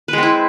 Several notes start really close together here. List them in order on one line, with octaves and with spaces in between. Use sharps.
B4 G#3 C4 E4